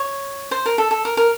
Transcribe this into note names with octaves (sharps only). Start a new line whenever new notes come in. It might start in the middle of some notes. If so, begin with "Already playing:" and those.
Already playing: C#5
C5
A#4
A4
A4
A#4
A#4